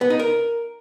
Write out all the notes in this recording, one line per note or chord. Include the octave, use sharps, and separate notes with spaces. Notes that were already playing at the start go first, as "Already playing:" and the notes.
B3
D#4
A#4